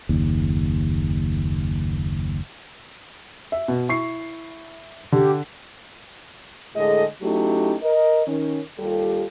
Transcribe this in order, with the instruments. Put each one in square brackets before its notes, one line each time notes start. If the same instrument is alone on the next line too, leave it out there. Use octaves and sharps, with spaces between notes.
[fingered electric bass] F#1 D#2
[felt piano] E5
B2
E4 C#6 C7
[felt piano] D3 [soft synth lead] G4
[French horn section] A2 D3 G#3 G#4 A4 D#5
F#3 A3 C#4 D#4 E4 G4
A#4 D#5
D#3 C#4
D#2 G3 F4 G4 A4